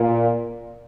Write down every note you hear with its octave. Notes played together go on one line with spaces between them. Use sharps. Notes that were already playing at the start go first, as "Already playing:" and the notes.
Already playing: A#2